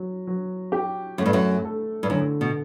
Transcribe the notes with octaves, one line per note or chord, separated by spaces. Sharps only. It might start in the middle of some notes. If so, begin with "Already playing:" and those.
Already playing: F#3
F#3
G4
F#2 A3
G2
F#2
A4
G2
F#2 D3
B2